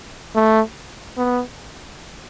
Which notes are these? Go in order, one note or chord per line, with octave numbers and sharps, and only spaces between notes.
A3
B3